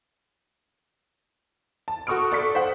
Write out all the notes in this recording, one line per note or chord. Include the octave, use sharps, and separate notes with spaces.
A5
F#4 A4 C#6 D#6 F6 D7
A4 D5 C#6 B6
C5 F#5